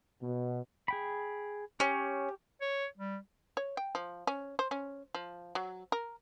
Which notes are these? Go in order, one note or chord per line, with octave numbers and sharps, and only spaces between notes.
B2
G#4 G5 B5
C#4 G4
C#5
G3
C#5
G5
F3
C#4
C5
C#4
F3
F#3
A#4